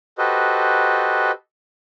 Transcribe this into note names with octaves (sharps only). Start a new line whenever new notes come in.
F#4 G4 A4 B4 C5 D#5